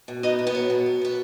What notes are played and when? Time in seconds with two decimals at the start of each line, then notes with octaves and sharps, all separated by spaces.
0.08 B2
0.23 B3 D#4 D#5
0.39 B2
0.47 B3 B4
0.55 F#3
0.70 B2
0.86 B3
1.01 B2 B4